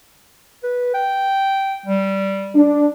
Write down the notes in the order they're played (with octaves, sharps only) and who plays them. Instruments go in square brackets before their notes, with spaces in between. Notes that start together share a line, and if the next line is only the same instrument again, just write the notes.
[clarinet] B4
G5
G3
[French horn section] D4